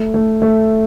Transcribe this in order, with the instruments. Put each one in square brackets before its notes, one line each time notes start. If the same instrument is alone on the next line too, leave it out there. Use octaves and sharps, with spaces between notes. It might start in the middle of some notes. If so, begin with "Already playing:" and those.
Already playing: [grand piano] A3
A3
A3